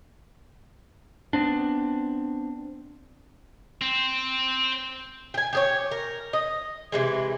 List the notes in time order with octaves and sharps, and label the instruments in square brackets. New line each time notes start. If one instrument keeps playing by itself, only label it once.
[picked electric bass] B3 C4 D4
[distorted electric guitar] C4
[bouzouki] G5 G#5
G4 G#4 C#5
A#4
D#5
C3 E3 G#3